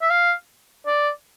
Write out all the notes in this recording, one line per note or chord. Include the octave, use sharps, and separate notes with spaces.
E5
F5
D5